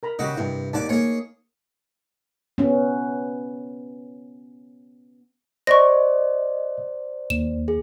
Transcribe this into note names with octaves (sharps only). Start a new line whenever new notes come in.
A#4 A#5 B5
C#3 F#4 G4 D#5
G2 C3 E4
D#2 D#4 D5 F#5 A5 D6
A#3 G#4 C#5 G#5
B3 C#4
C5 D5 D#5 C#6 A#6
D#2 E7
G#4